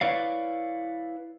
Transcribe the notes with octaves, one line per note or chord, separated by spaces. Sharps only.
E4 B4 C#5 D5 F5